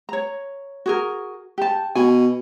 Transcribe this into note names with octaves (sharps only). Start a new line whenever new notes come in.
C#5 A#5
F#4 G#4 A#4
G4 A5
B2 G#5